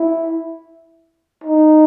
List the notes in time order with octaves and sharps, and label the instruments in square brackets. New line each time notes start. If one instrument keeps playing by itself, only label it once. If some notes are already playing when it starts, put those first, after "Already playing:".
Already playing: [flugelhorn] E4
D#4